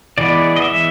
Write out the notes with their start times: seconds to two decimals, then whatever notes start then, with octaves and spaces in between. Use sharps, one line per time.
0.18 E3 G#3 B3 D5
0.56 D#5
0.62 E5